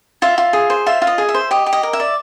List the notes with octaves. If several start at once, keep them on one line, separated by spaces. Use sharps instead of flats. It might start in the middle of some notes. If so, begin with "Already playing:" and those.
F4 E5
F4
G#4
C5
F4 E5
F4
D#5
G#4
E5
C5
G4 D#5
G4
D#5
A#4
E5
D5